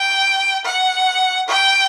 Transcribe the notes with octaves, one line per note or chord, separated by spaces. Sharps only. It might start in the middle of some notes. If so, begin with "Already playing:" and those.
Already playing: G5
F#5
G5